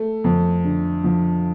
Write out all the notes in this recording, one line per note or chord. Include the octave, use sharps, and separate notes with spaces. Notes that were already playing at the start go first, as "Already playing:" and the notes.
Already playing: A3
F2
D3
F3